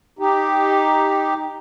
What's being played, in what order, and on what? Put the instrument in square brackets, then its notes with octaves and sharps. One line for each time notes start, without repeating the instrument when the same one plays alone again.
[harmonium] D#4 G4